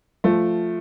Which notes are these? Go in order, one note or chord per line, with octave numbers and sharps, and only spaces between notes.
F3 A3